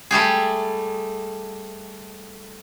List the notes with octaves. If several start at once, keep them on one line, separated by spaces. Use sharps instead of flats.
G3 A3 G4 G#4